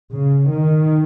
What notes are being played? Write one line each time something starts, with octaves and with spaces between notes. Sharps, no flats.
C#3
D#3